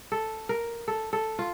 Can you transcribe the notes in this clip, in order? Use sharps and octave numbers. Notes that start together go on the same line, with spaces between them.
A4
A#4
A4
A4
F4